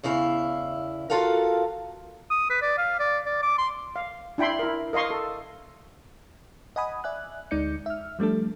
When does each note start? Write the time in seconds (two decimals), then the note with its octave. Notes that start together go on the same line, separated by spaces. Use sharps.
0.03 E2 C#3 E4 F5
1.10 F4 F#4 A4 A#4 F5
2.30 D#6
2.50 B4
2.62 D5
2.78 F5
3.00 D5
3.25 D5
3.42 D6
3.58 C6
3.96 F5
4.38 D4 E4 G5 B5 C6
4.59 E4 A#4
4.93 A#4 D#5 F5 C6 C#6
5.10 A4
6.76 D#5 F#5 G#5 B5 D#6
7.04 D5 E5 G#5 F#6
7.51 D2 G#3 D#4 D5 G6 C#7
7.86 E5 F6
8.19 F3 G3 A3 D4 A4